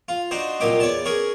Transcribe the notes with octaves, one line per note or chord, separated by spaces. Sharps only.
F4
D4 D#4 F#4 C5 D#5
C2 A#2 F#3 G4 D#5 D6
E2 C#5 D5 A5
C#4 G#4 A#4 C#6